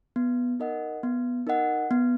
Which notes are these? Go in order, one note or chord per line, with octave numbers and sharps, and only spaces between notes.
B3
D#4 A#4 D#5 F#5
B3
D#4 A#4 D#5 F#5
B3